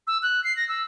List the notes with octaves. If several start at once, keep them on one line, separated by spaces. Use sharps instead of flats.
E6
F#6
C7
A#6
E6